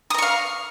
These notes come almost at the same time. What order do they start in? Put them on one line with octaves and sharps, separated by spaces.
D#6 A#5 C#6 F5